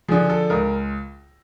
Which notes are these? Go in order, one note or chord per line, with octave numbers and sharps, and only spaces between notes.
D3 F3 G#4
A4
C#2 A#4